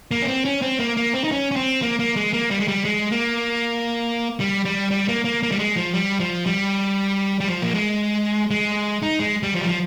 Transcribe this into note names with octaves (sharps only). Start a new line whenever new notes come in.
A#3
C#4
C4
C#4
C4
A#3
A#3
C4
D#4
C#4
C#4
C4
A#3
A#3
G#3
A#3
G3
G#3
G3
G#3
A#3
G3
G3
G3
A#3
A#3
A#3
G3
G#3
F3
G3
F3
G3
G3
F3
A#3
G#3
G#3
D#4
G#3
G3
F3
G3
F3